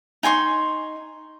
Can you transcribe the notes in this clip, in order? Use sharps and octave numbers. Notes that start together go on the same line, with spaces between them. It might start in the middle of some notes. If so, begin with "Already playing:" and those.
D#4 G#5 C6 C#6